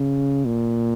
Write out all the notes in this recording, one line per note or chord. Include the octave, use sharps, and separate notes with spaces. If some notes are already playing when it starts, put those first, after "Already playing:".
Already playing: C#3
A#2